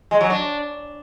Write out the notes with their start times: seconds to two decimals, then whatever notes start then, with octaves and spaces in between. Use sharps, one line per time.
0.11 G#3
0.21 F#3
0.30 D4